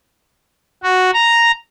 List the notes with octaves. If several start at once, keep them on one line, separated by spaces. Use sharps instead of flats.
F#4
A#5